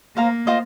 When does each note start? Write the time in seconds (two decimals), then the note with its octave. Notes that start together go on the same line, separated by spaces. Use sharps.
0.17 A#3 C5 F5 A#5
0.47 F4 C5 D#5